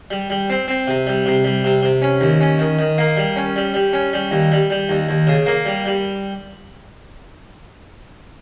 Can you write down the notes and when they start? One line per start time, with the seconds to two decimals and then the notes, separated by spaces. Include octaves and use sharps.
0.11 G3
0.30 G3
0.50 C4
0.68 C4
0.88 C3
1.07 G3
1.26 C3
1.44 G3
1.64 C3
1.83 C3
2.02 C#4
2.21 D#2
2.41 C#4
2.59 D#3
2.79 D#3
2.98 A#3
3.17 G3
3.36 C#4
3.56 G3
3.74 G3
3.93 C#4
4.13 G3
4.31 D#2
4.52 G3
4.70 G3
4.89 D#2
5.09 D#2
5.27 C#3
5.46 A#3
5.66 G3
5.86 G3